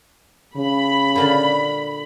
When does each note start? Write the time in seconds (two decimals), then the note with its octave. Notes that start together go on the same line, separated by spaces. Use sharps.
0.57 C#3 B5
1.15 A#2 D3 F4